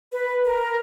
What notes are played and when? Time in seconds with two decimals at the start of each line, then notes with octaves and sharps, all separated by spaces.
0.12 B4
0.44 A#4